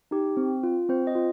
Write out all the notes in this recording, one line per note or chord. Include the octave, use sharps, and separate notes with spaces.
D#4 G4
C4
F4
C4 C5
D#5
F4